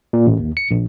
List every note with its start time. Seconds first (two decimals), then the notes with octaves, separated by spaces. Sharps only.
0.13 A#2
0.27 A1
0.39 D#2
0.57 C#7
0.71 A#1